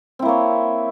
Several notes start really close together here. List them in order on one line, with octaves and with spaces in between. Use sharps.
C4 E4 A#3 C#5